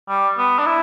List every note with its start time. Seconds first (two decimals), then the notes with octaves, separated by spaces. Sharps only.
0.09 G3
0.38 B3
0.59 D4
0.66 E4